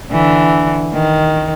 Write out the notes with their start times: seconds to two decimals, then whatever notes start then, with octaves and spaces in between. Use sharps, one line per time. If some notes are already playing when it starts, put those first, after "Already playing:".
0.11 D3 E3
0.94 D#3